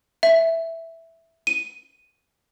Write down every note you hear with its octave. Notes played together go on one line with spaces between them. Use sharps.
E5
D#7